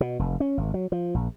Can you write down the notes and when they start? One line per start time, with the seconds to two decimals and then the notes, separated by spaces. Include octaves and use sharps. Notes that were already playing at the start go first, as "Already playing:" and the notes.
0.01 B2
0.19 F1
0.40 C#4
0.57 G#1
0.74 F#3
0.92 F3
1.14 A#1